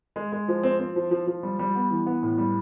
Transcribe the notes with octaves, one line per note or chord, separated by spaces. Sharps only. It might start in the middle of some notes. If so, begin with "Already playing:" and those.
G#3
G#3
F3
C4
C4
F3
F3
F3
G3
G3
B3
E3
B3
A2
G3